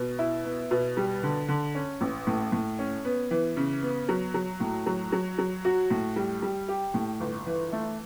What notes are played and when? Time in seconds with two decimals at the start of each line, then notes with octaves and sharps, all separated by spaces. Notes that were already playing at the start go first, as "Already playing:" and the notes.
Already playing: B2
0.19 E4
0.45 B3
0.71 B2
0.97 G3
1.23 D3
1.48 D3
1.75 C#4
2.01 A1
2.27 A2
2.52 A2
2.79 C#4
3.05 B3
3.31 E3
3.57 C#3
3.82 B3
4.09 F#3
4.34 F#3
4.60 A2
4.86 F#3
5.12 F#3
5.38 F#3
5.65 F#4
5.90 A2
6.16 G3
6.42 G3
6.69 G4
6.94 A2
7.20 G1
7.46 E3
7.73 A3